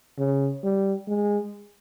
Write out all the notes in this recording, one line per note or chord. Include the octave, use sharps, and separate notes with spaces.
C#3
G3
G#3